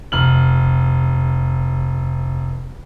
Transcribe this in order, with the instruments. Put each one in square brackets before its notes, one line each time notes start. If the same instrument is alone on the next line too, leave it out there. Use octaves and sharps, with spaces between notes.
[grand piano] F1 F6 F#7